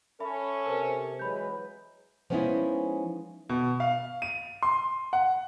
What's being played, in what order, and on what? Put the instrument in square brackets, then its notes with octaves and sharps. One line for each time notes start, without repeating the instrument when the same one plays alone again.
[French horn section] C#4 A4 [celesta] E5 B5
[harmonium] C3 [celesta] A#4 C5
[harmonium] E3 F#3 G#3 [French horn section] B4 [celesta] B5 G6
[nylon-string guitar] F3 G#3 B3 C#4 D#4 E4
[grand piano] B2
F5
D#7
C6
F#5